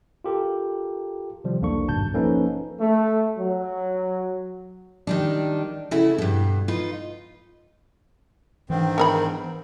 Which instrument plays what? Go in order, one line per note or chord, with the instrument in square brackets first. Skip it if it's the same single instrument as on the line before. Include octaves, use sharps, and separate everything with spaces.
[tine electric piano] F4 G4 A4 A#4
C3 D#3 F3 G3
B1 E2 A#3 D4 A4 C#6
G#1 G2 B2 A5 G6
F3 A#3 C#4 D#4 A4 B4
[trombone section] A3
F#3
[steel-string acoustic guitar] D#3 G3 D4
C#3 A3 E4 F#4
G2 B2
D#4 F4 B4
[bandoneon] G#2 D#3 C4 [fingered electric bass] E3 D4
[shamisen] B3 A#4 B5